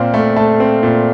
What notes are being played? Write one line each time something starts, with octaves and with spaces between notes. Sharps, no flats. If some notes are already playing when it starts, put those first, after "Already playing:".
Already playing: A#2 C4 F5
A3
A3 A5
C4
A#2